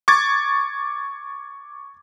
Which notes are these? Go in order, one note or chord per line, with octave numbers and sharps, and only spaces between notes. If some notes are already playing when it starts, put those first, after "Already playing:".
C#6 D6 G#6 A6